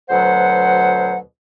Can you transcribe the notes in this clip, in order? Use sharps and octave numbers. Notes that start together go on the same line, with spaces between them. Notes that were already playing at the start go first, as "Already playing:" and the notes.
D2 B2 F#3 C5 F#5